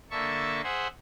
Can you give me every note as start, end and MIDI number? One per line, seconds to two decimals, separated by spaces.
0.11 0.61 50
0.11 0.61 58
0.11 0.61 76
0.11 0.61 81
0.11 0.61 85
0.64 0.88 68
0.64 0.88 72
0.64 0.88 76
0.64 0.88 78
0.64 0.88 84